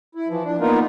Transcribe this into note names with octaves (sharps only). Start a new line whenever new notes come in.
E4
E3 F3
D4
A#3 B3 D#4 F4 A#4